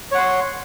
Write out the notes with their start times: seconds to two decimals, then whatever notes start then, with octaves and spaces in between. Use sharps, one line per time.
0.12 C#5
0.15 F#5
0.18 C6